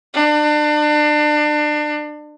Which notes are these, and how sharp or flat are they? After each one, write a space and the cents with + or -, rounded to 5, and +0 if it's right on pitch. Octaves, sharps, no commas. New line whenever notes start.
D4 +30